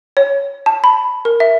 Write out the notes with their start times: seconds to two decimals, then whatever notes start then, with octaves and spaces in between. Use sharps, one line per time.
0.17 C#5
0.66 A5
0.84 B5
1.25 A#4
1.40 E5